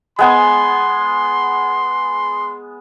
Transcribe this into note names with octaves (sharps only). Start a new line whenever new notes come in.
G#3 B3 G#5 C6